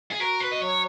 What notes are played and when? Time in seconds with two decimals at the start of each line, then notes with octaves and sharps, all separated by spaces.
0.11 G#4
0.20 F#4 A#4
0.40 B4
0.52 D#5
0.61 F#3 C#5